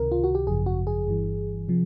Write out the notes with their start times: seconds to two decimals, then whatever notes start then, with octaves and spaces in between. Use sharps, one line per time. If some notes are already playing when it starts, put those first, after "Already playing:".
Already playing: C#2 C3 D#3 A#4
0.12 F4
0.24 F#4
0.35 G4
0.47 G#1 F#2 C#3 F3 G#4
0.66 F#4
0.87 G#4
1.07 G1 G2 E3
1.68 C3 F3